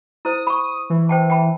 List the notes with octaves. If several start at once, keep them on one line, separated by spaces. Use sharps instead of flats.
E4 C5 D#6
B5 C#6
E3
C5 G5 A5
G5 A5 B5